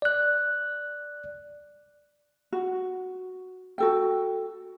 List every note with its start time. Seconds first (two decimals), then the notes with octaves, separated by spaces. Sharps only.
0.02 D5 F#6
2.52 F#4
3.78 F#4 A4 G5